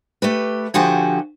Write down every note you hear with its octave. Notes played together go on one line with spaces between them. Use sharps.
A3 G4 B4
D3 F3 F#4 G4 G#5